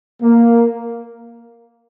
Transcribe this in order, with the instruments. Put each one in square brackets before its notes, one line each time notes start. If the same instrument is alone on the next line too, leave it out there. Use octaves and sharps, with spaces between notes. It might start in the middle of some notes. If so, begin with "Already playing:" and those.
[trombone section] A#3